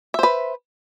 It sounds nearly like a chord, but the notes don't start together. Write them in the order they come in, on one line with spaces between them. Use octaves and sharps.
E5 C5 B4